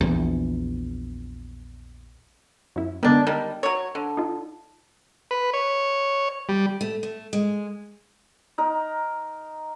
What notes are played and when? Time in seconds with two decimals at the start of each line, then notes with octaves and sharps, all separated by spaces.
0.01 A#1 E2
2.76 F#2 E4
3.03 D3 D#3 G#3 B3 D4
3.27 D#3 G3
3.63 F#3 C#5
3.95 D3
4.17 D#4 F4
5.31 B4
5.53 C#5
6.49 G3
6.81 A3
7.03 A3
7.33 G#3
8.58 D#4 A#4